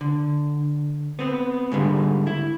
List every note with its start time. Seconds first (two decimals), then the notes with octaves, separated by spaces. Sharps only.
0.01 D3
1.19 B3 C4
1.72 G#2 D3 G3
2.27 E4